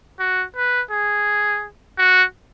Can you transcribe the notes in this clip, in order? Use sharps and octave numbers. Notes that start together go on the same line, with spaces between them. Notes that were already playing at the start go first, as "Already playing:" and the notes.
F#4
B4
G#4
F#4